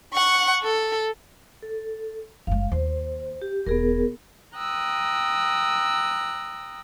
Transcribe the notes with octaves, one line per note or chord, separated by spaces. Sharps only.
F#5 C#6
A4
A4
F#1 G#3 F5
D#2 C5
G4
E1 B3 G#4 A#4
G5 A#5 D#6 E6 F#6